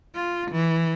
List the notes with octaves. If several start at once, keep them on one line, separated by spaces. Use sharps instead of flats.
F4
E3